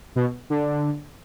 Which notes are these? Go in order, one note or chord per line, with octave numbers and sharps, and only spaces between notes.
B2
D3